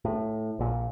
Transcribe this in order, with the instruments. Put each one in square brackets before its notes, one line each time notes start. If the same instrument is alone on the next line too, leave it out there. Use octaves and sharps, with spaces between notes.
[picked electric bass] A2
A#1 A#2